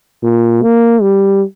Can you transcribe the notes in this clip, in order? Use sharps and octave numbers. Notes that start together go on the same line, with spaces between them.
A#2
A#3
G3